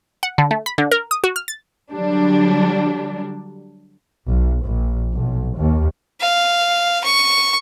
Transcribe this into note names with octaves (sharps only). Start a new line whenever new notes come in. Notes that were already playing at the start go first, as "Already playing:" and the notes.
F#5
D3
A3
B5
D3
A#4
D#6
F#4
F6
A6
D3 F#3 G3 D4
B1
A#1
B1
D#2
F5
C#6